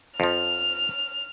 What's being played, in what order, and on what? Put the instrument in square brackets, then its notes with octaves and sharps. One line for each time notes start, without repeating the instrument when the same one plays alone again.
[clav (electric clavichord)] F2 F3 [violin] F6